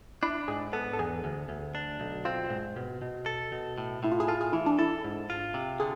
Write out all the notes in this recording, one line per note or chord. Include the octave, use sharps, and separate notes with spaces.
D4 E4
G#2 G#4
B3 A4
A4
E2 G#4
D2
D2
D4
B1
C4 F4
G#2
B2
B2
A4
B2
A2
A2 E4
F4
G#4
F4 A4
G#4
E3 E4
D4
E4 A4
G#2
F4
C3
D3 G#4